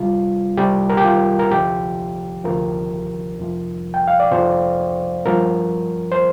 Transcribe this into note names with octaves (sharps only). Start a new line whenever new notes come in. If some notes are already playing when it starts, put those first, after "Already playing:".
Already playing: C2 C3 G3 F4
C2 C3 G3 G4
A#4
G4
F4
A#4
D2 C3 F3 G4
D2 C3 F3 A#4
F2 C3 F3
G5
F5
D5
F2 C3 F3 C5
G2 F3 A#4
C5